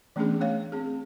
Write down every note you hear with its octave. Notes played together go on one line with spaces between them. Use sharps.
E3 A3 B3 C#4 D4 G#4
A3 C#5 F5
C4 G#4